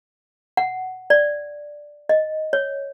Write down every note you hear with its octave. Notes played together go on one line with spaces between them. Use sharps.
F#5
D5
D#5
C#5